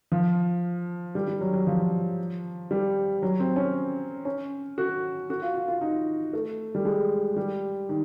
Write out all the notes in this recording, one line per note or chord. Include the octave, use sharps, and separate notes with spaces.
F3
G3
G3
F#3
F#3
F3
G3
F#3
C4
C#4
C#4
F#4
F#4
F4
F4
F4
D#4
A3
G3
G#3
G3
D#3